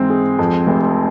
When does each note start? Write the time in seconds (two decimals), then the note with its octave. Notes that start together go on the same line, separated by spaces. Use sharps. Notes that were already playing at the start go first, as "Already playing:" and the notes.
Already playing: G#2 E3 C4
0.10 G#3
0.39 F2
0.67 F1